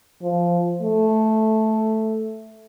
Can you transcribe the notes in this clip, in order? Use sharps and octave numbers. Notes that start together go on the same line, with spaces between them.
F3
A3